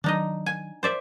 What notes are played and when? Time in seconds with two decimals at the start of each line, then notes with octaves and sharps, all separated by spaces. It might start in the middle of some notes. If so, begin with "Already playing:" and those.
0.04 D#3 F#3 D4 D#4 D#5
0.46 G#5
0.83 C5 D5 E5